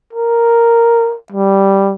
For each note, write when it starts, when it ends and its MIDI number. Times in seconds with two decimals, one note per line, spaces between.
0.13 1.15 70
1.32 1.95 55